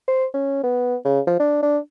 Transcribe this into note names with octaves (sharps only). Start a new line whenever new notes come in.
C5
C#4
B3
C#3
F3
D4
D4